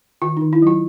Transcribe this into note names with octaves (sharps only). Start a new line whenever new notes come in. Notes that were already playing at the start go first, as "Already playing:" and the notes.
D#3 F4
D#3 D#4
E4
F#3 F4